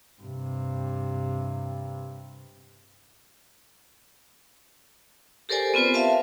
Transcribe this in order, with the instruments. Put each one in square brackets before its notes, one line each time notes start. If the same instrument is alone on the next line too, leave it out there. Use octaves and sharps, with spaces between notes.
[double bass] G2 C3
[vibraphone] G4 A4 A#4 C5 D5 G#5
B3 C4 F4 B4 C5
E5 F5 A5